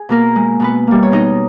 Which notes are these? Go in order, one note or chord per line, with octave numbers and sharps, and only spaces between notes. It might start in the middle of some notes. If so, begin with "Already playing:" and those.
Already playing: G#4
B2 A#3 A#4
G#3
B2 B3 B4
G3 A#3
C#5
B2 D#4 D#5